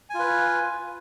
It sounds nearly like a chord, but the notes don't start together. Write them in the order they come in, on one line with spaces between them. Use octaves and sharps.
G#5 F4 B4